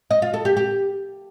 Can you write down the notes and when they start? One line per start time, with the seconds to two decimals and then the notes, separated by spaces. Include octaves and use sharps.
0.11 D#5
0.22 F4
0.34 A4
0.45 G4
0.57 G4